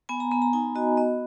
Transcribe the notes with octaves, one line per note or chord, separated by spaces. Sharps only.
B3 G#5
A#5
B3 B5
A#5
D#4 G#5
F#4 D#5
B3 D#5